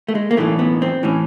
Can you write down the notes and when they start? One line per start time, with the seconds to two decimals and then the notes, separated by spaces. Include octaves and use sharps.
0.08 A3
0.15 G#3
0.31 A#3
0.37 B1 A2 E3 A3
0.59 B3
0.82 C4
1.03 A2 E3 C#4